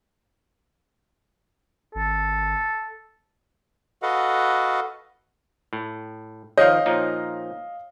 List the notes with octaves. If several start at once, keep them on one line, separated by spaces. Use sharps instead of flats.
G#1 A4
F#4 A4 B4 D#5 F5 F#5
A2
D#3 F3 C#5 D#5 F5
A#2 F3 D#4